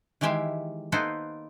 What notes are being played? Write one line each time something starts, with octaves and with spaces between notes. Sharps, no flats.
D#3 E3 G#3 G4 E5 F5
A#3 B3 D#4 A4 B4 C5